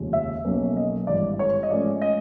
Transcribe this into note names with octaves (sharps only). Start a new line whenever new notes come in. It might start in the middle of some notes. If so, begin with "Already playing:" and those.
Already playing: F1 D#2 C#3 F3 G#3
E5
B1 B2 F#3 A#3 C#4
D#5
G#1 G2 E3 D5
C#5
D#5
G#2 F3 A3 C#4 D5
D#5